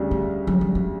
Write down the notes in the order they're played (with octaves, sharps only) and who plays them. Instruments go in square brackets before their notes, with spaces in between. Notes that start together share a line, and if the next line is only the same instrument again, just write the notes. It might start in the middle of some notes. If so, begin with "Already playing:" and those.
Already playing: [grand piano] D2 C#3 G3
[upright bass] A3
F#3
G3
F#3